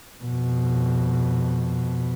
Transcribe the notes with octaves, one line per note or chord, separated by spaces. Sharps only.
F2 B2